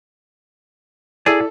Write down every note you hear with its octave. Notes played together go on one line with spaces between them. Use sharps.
E4 G#4 A4 D5 E6